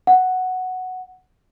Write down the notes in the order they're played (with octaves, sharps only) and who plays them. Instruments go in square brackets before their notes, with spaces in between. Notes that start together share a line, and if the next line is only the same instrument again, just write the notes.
[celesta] F#5